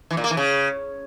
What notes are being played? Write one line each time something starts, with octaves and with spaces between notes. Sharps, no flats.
E3
A#2
A#3
E3
C#3